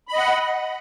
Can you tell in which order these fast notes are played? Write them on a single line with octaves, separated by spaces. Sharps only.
B5 D#5 F#5